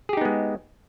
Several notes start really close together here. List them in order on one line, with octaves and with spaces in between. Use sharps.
G#4 G4 D#4 B3 G#3